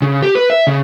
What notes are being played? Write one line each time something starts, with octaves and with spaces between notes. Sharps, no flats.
C#3
G4
B4
E5
C#3